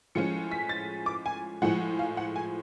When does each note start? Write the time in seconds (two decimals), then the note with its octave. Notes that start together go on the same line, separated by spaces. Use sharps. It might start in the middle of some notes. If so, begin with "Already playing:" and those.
0.15 A2 F3 G#3 C#4 C#7
0.51 B6
0.69 A6
1.06 D6
1.26 G#5
1.62 A2 F3 G#3 F#5
1.99 F5
2.17 F#5
2.36 G#5